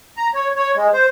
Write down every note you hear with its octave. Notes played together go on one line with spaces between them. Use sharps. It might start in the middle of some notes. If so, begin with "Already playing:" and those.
A#5
C#5
C#5
G#3
C5